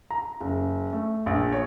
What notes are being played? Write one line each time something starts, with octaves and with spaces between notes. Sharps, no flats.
A#5
F#1
A3
A#1
C#5